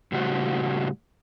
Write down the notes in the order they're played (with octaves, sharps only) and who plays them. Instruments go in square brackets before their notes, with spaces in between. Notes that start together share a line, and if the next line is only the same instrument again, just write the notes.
[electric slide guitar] A2 C#3 G3 F#4 C5